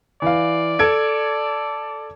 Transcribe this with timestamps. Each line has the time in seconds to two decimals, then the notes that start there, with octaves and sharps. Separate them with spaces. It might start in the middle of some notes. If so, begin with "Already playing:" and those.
0.22 E3 D5 F5
0.79 A4 G#6 D7